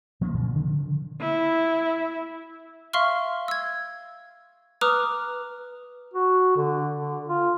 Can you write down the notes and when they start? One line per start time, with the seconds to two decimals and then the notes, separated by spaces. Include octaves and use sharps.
0.21 F3 A#3 C4 D4
0.34 G2 A#2 D3
0.55 C#3 F3 F#3
1.21 E4
2.93 E5 F5 C6 C#6 F6
3.48 E6 G#6
4.81 B4 A#5 D6 D#6 F6 F#6
6.14 F#4
6.56 D3
6.96 D3
7.28 F4